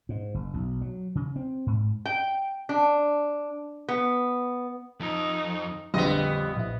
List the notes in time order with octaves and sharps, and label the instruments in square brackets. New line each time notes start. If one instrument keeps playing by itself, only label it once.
[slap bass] G#2
F#1
B1
F#3
C#3
C4
G#2
[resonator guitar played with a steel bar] G5
D4
B3
[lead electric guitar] F2 [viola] D#4
[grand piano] A#1 F2 F4 [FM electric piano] D3 [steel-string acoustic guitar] G3 [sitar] B3 D#5
[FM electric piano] A#1 E4